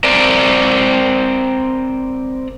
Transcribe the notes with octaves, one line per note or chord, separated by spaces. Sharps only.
C4 A#4 D5